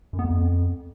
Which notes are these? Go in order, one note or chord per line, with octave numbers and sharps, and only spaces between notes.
F#2
B3
F2